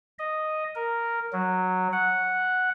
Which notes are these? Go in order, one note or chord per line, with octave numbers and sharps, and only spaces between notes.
D#5
A#4
F#3
F#5